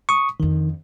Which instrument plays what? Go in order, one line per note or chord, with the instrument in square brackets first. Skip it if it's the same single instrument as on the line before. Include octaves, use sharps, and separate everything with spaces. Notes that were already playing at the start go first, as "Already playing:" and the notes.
[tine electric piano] C#6 D#6
[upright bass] F2 D4 [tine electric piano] D#3